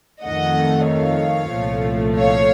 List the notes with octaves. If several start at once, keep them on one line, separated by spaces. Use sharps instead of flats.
F2 D#3 A3 D#5 F#5
C#5 F5
C2 A#2 F3 A3
C#5 F5